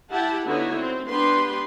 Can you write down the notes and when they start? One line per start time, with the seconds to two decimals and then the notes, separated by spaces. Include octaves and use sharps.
0.11 E4 G4 F#5 A5
0.46 D3 B3 D#4 E4 F#4 C#5
0.77 C4
1.08 B3 D4 G4 B4 C6